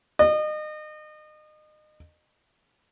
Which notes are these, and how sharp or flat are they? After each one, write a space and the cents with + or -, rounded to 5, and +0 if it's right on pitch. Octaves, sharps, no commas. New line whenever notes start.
D#5 -30